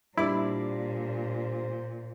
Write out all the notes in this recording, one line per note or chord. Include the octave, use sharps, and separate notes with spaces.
A#2 G3 D4 E4 C5 D5